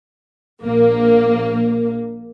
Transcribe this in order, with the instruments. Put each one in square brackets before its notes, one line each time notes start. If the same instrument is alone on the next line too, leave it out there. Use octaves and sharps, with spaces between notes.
[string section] A#1 A#3